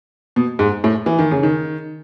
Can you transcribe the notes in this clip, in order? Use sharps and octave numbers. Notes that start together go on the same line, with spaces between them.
B2
G#2
A2
E3
D#3
C#3
D#3